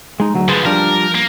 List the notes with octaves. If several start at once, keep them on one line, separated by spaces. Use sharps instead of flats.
G#3 D#4
D2 F#3
D3 F3 G#4 B4 C5
F3 G3 D4 A#4
A#3